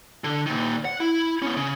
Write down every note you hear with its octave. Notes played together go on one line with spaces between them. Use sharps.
D3
A#2 D#3
F#5
E4
B3 C#4
C#3